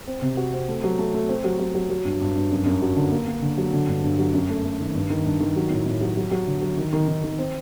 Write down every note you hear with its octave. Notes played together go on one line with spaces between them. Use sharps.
C4
C3
F#4
C4
A3
F#3
A3
A3
C4
F#3
F#3
F#3
F#3
G2
G2
G2
F#2
F#2
F#3
D3
A#3
A#3
D3
F#3
D3
G2
G2
F#3
F#2
A3
A3
D#3
G2
D#3
G2
D#3
F#3
A2
A2
F#3
F#3
F#3
D3
F#3
D#3
D#3
D#3
D#3
C4